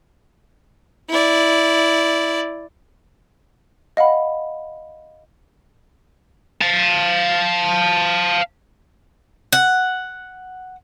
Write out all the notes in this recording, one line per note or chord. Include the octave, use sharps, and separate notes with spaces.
E4 D5
D#5 F5 F#5 B5
F5 A5
F#5